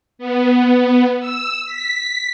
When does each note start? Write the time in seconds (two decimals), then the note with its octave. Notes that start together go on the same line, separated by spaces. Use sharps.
0.19 B3
1.20 E6
1.66 B6